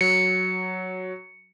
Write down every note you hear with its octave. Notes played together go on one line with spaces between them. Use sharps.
F#3 C#7